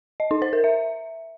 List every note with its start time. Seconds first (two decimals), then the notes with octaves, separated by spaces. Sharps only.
0.20 D#5
0.31 D#4
0.42 C5
0.53 A#4
0.64 E5